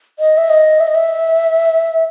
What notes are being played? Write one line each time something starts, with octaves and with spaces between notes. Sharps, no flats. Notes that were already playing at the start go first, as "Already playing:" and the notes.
D#5
E5
D#5
E5
D#5
E5